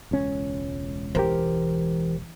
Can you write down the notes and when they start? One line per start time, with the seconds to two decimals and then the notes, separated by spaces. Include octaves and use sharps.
0.11 E1 C#2 C#4
1.15 E3 G4 A#4 C5